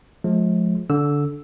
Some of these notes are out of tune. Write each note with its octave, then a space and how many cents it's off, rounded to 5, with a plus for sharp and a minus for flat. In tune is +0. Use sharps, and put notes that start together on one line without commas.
F3 +25 G#3 +40
D3 -15 E6 +0